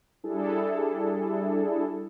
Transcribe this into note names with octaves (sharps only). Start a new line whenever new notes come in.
G3 D4 E4 G#4 A4